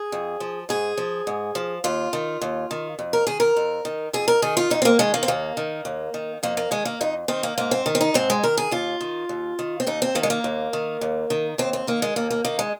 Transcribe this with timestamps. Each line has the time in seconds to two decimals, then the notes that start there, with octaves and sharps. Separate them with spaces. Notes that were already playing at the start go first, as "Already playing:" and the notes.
Already playing: G#4
0.12 F2
0.40 F3
0.69 G#2 G#4
0.97 F3
1.27 G#2
1.55 F3
1.84 D#2 F4
2.13 D#3
2.42 D#2
2.71 D#3
2.99 F2
3.13 A#4
3.27 D#3 G#4
3.40 A#4
3.56 F2
3.85 D#3
4.13 F2 G#4
4.28 A#4
4.42 D#3 G#4
4.57 F4
4.70 F2 D#4
4.82 C4
4.85 A#3
4.99 D#3 G#3
5.14 A#3
5.23 C4
5.28 D#2 A#3
5.57 D#3
5.85 D#2
6.14 D#3
6.43 F2 A#3
6.57 A#3
6.71 D#3 G#3
6.85 A#3
7.01 F2 D#4
7.28 D#3 C4
7.43 A#3
7.58 G#2 A#3
7.71 C4
7.86 D#3
7.95 C4
8.01 D#4
8.14 G#2 C4
8.30 G#3
8.43 D#3 A#4
8.57 G#4
8.71 D#2 F4
9.01 D#3
9.29 D#2
9.59 D#3
9.80 C4
9.87 D#2 D#4
10.02 C4
10.15 D#3 A#3
10.23 G#3
10.30 A#3
10.44 D#2
10.73 D#3
11.01 D#2
11.30 D#3
11.58 D#2 C4
11.73 C4
11.87 D#3 A#3
12.02 G#3
12.16 D#2 A#3
12.30 A#3
12.45 D#3 A#3
12.59 G#3